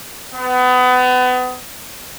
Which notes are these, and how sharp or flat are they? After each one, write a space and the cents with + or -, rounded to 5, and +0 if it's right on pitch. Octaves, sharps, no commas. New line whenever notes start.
B3 +30